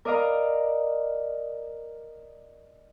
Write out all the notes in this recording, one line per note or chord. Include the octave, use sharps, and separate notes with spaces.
A#4 D5 D#5 F5 A#5